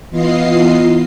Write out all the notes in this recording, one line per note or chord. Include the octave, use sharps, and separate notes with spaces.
E3 B3 F4 D#5 C7